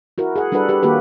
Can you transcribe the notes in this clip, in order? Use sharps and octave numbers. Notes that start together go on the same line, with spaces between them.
E4 F#4 A#4
G#4 F#5
G3 D4 F#4 A4 B4 F#5
G4 B4
D#3 A#3 F#4 G4 B4